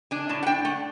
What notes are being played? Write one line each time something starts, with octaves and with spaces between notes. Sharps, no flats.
D4 G#5
A2 A5
F#5
D4 G5
A3 F#5